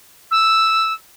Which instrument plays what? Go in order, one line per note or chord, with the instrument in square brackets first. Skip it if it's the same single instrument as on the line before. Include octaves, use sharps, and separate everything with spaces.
[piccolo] E6